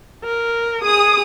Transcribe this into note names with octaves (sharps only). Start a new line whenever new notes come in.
A#4
G#4 D#6